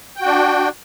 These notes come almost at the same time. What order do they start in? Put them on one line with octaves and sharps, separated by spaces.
G5 F#4 D4